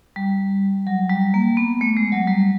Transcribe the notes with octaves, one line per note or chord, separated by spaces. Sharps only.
G3
F#3
G3
A#3
B3
A3
G#3
F#3
G3